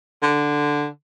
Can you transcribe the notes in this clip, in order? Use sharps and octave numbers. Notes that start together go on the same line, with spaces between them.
D3